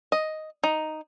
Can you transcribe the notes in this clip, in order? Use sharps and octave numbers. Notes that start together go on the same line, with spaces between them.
D#5
D#4